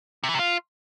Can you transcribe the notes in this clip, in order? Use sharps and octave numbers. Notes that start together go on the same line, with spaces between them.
C3
E3
C3
F4